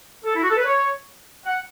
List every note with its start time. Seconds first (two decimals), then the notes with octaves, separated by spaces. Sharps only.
0.24 A4
0.34 E4
0.42 F#4
0.49 A4
0.56 B4
0.64 C#5
1.44 F#5